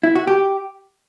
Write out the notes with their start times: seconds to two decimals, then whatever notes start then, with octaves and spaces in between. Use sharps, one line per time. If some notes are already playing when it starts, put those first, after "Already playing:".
0.03 E4
0.15 F#4
0.27 G4